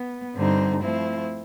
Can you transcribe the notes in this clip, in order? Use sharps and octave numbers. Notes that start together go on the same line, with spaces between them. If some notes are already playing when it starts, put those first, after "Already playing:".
Already playing: B3
G2 D3 G3 C4 D#4
F3 A3 C4 E4